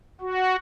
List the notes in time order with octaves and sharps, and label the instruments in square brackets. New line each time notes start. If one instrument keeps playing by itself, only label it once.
[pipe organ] F#4